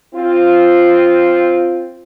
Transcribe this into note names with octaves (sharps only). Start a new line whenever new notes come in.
C4 F4